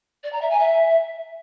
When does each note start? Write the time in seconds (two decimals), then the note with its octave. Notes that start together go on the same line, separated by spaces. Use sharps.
0.23 D5
0.32 A#5
0.41 E5
0.50 G#5
0.59 E5